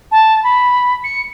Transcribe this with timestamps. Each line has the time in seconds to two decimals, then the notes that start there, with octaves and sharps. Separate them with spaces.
0.11 A5
0.44 B5
1.04 C#7